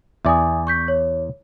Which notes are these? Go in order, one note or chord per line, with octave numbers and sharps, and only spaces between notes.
E2 D5 E5 G#5 D#6
C#6 G6 B6
C#5